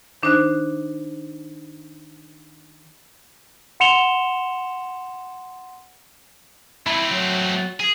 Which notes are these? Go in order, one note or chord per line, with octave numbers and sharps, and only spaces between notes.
D#3 D4 D#4 C5 F#6
F#5 C6 C#7 E7 F7 G7
A3 C4 E4 B5
F#3
G#4